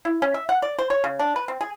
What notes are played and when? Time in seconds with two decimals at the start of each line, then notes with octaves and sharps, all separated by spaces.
0.05 E4
0.22 C#4
0.34 E5
0.49 F#5
0.62 D5
0.79 C5
0.90 C#5
1.04 C#3
1.19 D4
1.36 B4
1.48 C4
1.61 G#4